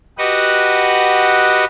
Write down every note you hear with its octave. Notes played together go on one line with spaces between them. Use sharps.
F#4 G4 B4 D#5 F#5